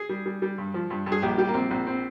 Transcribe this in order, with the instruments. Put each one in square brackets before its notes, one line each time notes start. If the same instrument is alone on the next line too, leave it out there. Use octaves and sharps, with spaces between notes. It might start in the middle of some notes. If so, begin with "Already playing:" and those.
Already playing: [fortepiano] G#4
G3
G3
G3
G2
F3
G2
G2
G#4
A#1 G4
G3 G4
A#3
A#1 C4
A#1 C4
C4